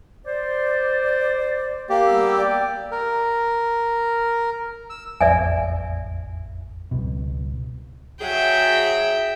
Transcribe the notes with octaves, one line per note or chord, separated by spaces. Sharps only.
C5 D5
A#3 G4
G3 B3 E6
D5 G5
A#4
E6
E1 A1 F2 D5 E5 G#5
G#1 C#2 B2
F#3 G#4 E5 G5